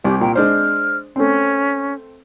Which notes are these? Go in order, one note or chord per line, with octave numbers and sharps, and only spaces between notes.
C2 G4
A#2 G5
G#3 D4 C5 F6
A3 C4 C#4